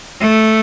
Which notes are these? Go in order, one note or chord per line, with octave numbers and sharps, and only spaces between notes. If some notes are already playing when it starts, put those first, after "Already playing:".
A3